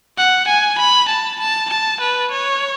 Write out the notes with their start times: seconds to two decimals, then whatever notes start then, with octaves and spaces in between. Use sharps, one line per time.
0.18 F#5
0.48 G#5
0.79 B5
1.09 A5
1.40 A5
1.70 A5
2.01 B4
2.31 C#5